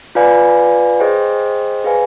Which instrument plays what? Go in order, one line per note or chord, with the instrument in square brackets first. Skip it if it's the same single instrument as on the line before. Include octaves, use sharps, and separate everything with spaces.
[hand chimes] F4 B4 D5 F5 G#5
G#4 C5 D#5 G5
G#4 B4 D5 F5 G#5